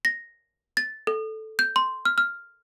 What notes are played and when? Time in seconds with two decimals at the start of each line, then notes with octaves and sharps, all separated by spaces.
0.05 A#6
0.77 A6
1.07 A4
1.59 G6
1.76 C6
2.05 F6
2.18 F6